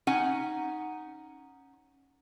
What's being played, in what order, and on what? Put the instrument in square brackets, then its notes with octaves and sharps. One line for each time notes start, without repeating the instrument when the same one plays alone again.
[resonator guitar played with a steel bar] C#4 D#4 F#5 G#5